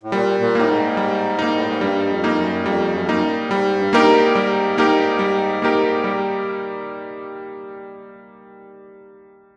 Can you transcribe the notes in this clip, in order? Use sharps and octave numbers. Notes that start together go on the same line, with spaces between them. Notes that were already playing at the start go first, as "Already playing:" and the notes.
A2
A#2 G3
A#2
A2 A#3 D#4
G#2
G3
A#3 D#4
A2
G#2
G2 G3
F2
A#3 D#4
F#2
F2 G3
F#2
F2
F#2 A#3 D#4
A2
G#2 G3
G2
A#3 D#4 G4 A#4
G#2
G3
A#3 D#4 G4 A#4
G3
A#3 D#4 G4 A#4
G3